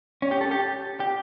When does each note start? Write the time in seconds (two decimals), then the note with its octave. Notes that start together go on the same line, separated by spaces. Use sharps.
0.22 C#4
0.31 G4
0.41 A4
0.51 G4
1.00 G4